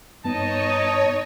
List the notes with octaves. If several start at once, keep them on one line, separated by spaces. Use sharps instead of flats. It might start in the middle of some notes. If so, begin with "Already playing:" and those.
G2 B3 D#4 C#5 D#5 A5